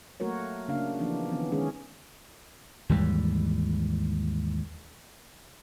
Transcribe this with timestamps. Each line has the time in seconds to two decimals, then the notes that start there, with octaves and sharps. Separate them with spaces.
0.20 F#3 A3 A#3 F#4 A#4 C#5
0.68 C#3 A#3 D4 F5
0.99 E3 F3 A#3 B3 D4 D#4
1.30 D#3 E3 B3 C#4
1.52 D#3 G#3 C#4 G#4
2.89 D#2 G#2 E3 G3